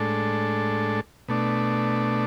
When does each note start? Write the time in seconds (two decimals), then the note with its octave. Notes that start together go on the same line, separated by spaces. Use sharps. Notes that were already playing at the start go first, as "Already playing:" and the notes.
Already playing: A2 G#3 D4 A4
1.28 B2 A3 D4